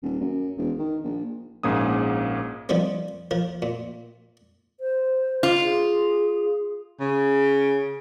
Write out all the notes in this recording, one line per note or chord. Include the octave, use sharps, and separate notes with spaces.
D#1
F#2
E1
D#3
A#1
A#1 G#2 A#3 C#4 D#6
D#3 F3 G3 B3 C4
F3 A#4
A#2
C5
F4
G#4
C#3